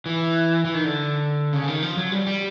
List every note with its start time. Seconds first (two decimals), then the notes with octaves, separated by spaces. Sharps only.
0.06 E3
0.65 E3
0.74 D#3
0.84 D3
1.53 C#3
1.64 D3
1.68 D#3
1.82 F3
1.97 F#3
2.12 G3
2.26 G3